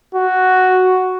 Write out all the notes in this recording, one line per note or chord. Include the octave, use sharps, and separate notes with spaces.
F#4